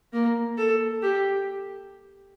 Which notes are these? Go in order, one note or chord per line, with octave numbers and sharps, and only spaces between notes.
A#3
A4
G4